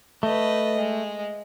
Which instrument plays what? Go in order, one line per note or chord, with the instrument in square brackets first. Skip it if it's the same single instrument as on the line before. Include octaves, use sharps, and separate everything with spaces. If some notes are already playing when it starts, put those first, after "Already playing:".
[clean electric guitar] A3 [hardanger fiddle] B4 D#5
[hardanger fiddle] G#3